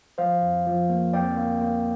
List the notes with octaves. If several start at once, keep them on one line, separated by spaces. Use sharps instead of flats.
F3 C5 F5
F2
F3
A#3
F2 D5 G5
A#3
A#3